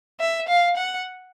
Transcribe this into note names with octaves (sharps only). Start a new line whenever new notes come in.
E5
F5
F#5